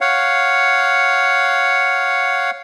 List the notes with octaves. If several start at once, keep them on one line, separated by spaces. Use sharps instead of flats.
C#5 F5 F#5